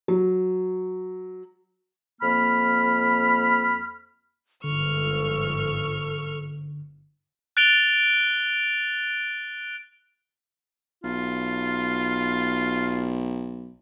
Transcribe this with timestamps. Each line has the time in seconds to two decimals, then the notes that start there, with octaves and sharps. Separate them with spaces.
0.08 F#3
2.21 F2 A#3 B5 F6
4.64 G1 G#2 D3 F3 A4 C#6 F6
7.57 F#6 A6 D7 F7 G7
11.04 B1 F4